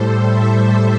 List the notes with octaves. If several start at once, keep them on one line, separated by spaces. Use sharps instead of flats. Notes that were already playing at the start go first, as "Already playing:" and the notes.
Already playing: A2 G3 A4 C5
C5 E5